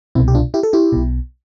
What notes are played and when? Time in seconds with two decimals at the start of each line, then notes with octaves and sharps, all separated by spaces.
0.15 C2 B2 C4 E4
0.28 G4
0.35 D4 F4
0.54 E4 G4
0.63 A4
0.73 E4 G4
0.92 B1 B2